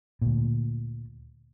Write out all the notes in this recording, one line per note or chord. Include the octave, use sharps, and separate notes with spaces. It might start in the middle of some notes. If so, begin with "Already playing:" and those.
D2 A#2